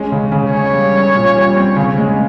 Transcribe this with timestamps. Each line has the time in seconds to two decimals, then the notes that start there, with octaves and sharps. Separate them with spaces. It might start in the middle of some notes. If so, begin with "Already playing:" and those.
Already playing: G#3 C#4
0.12 C#3
0.32 C#3
0.53 C#4 C#5
0.73 G3
0.94 C#4
1.15 A#2
1.35 G3
1.57 C4
1.76 C#3
1.98 G#3